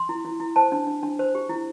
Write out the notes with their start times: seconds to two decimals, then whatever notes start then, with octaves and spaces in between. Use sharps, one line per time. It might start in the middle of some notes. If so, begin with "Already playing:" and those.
Already playing: C6
0.09 E4
0.25 E4
0.40 E4
0.56 C5 A5
0.72 D4
0.87 D4
1.03 D4
1.19 C5
1.35 G4
1.49 E4